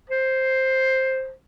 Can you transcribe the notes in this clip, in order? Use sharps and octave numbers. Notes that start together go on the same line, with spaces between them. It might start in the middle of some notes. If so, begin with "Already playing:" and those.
C5